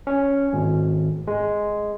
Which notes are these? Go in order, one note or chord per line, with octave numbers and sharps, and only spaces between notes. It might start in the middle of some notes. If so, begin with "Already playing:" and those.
C#4
G#1
G#3